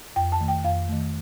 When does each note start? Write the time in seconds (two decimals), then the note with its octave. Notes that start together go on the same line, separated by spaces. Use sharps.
0.16 F2 G5
0.32 A5
0.40 D#3 A3
0.48 G5
0.64 F2 F5
0.89 D#3 A3